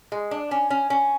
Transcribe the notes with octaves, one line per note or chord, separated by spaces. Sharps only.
G#3
D4
C#4
C#4
C#4